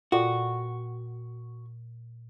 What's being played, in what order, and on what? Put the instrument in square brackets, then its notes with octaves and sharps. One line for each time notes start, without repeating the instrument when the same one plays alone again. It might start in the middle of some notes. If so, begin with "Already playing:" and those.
[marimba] A#2 G5 [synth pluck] F4 A4 D5 [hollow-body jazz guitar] F#4